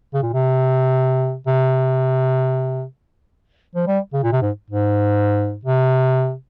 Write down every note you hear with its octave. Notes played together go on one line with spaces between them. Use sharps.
C#3
A#2
C3
C3
F3
G3
C#3
A#2
C3
G#2
G#2
C3